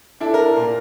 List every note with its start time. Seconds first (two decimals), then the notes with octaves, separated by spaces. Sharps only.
0.20 D4 E4 A4
0.34 A#4
0.56 A#2